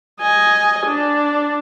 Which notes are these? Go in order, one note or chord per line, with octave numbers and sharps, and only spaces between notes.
D#5 G#5
D4